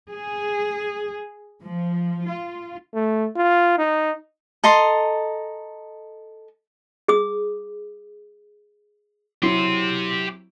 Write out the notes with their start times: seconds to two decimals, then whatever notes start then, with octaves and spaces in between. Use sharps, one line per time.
0.11 G#4
1.61 F3
2.26 F4
2.94 A3
3.36 F4
3.78 D#4
4.64 A4 D#5 A#5 C6
7.08 G#4 D#6
9.43 F#3 C4 E4 G4 C6